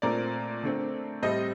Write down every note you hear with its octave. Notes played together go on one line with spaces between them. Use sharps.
A#2 A3 C4 A#4 D5
D3 A3 C4
A2 G3 C4 C5 D#5